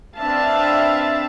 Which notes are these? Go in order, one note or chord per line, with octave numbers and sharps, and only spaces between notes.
C4 D4 B4 E5 F5 A5